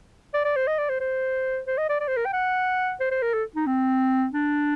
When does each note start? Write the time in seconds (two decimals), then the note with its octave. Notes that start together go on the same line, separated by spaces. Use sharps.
0.34 D5
0.44 D5
0.56 C5
0.67 D#5
0.78 D5
0.89 C5
1.00 C5
1.67 C5
1.78 D#5
1.89 D5
2.00 D5
2.08 C5
2.17 A#4
2.25 G5
2.33 F#5
3.00 C5
3.11 C5
3.22 A#4
3.34 A4
3.56 D#4
3.66 C4
4.33 D4